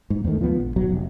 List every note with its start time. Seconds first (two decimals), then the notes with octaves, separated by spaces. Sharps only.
0.10 G#2
0.24 E2 G#2 D#3 A3
0.39 D2 F3 B3
0.60 A#1
0.76 D1 B1 B2 F#3
0.89 F1